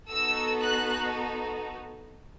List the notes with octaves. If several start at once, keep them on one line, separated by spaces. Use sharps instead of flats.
B3 D#4 F#4 A4 E6
F#6